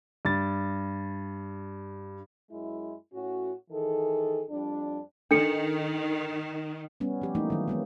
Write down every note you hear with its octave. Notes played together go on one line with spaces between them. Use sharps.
G2 A6
F#2 G#3 E4
A2 C#4 F#4
D#3 E3 G#4 A4
F2 G3 D4
D#3 D4 A4 C#7
G3 B3 C#4
F3 G4
E3 A3 A#3 D#4
D#3 F#3
G#3 A#3 B3